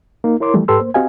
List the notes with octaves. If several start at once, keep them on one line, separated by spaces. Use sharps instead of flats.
A#3 D#4
E4 A#4 C#5 C6 D6
E3 F3 G3 A3
G#2 G4 A4 B4 C6 E6
A#3 C5
C4 F#4 G4 D#5 F5 G#5